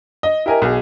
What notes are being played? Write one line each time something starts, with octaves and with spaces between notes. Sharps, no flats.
D#5
E4 G4 A#4 D#5 G#5
B1 G#4